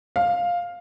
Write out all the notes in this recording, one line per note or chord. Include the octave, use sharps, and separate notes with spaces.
F5